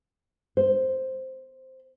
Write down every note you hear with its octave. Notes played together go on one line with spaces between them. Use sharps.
C5